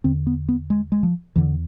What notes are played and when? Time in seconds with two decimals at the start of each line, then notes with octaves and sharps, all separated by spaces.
0.04 E2 D3 C4
0.27 B3
0.49 B3
0.70 G#3
0.92 G#3
1.03 F3
1.36 E2 D3 E3